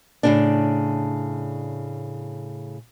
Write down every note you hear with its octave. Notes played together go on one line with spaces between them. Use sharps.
A2 C#3 D4